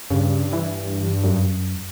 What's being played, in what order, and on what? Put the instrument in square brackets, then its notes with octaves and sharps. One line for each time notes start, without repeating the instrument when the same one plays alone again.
[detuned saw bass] G2 [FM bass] C#3
[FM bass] E3
F#2